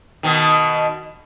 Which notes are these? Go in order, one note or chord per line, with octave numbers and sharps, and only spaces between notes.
B2 D#3